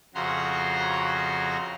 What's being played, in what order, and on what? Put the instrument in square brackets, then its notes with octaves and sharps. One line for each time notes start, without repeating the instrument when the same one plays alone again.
[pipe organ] F2 C#3 F#4 A#5 C6